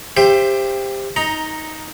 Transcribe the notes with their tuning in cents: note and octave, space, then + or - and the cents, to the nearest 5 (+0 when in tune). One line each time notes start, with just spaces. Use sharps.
G4 +15 C5 +0 E5 +25
D#4 +15 A#5 +0